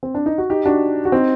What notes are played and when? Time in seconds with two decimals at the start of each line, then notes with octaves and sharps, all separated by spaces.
0.03 C4
0.15 D4
0.26 D#4
0.38 F#4
0.50 D#4 G4
0.65 D4 F#4
1.05 F#4
1.12 C4 D#4